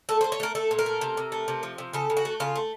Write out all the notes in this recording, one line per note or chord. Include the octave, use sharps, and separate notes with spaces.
A3 A4
C5
A3
C#5
A3 A#4
A3 A4
A#2
A#4
A3
C3
C3
A3
C3
F3
C3
C#3 A4
C#3
F#4
A3
C#3 F4
A3